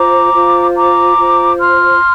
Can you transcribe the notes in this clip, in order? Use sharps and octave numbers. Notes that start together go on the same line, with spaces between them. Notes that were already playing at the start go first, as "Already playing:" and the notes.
Already playing: F4 C5 A#5 D6
F4 C5
A#5 D6
F4 C5
C6 F6